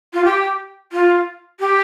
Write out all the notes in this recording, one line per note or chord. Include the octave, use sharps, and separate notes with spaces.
F4
G4
F4
G4